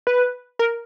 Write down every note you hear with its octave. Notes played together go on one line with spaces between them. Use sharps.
B4
A#4